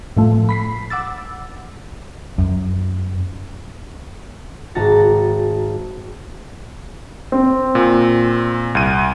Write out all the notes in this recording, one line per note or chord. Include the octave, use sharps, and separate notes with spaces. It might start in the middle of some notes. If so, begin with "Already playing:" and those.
A2 F3 A3
B5 B6 C7
F#5 D6 E6 A6
F#2
G#1 F#4 A5 A#5 A6 C#7
C4
A#2
C2 D#7